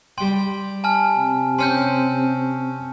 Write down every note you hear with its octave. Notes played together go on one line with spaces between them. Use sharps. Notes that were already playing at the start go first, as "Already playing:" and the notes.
G3 G5 C6
G#5 A5 F6
C3
C4 C#4 C6 F6 G6